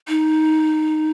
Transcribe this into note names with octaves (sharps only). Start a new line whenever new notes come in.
D#4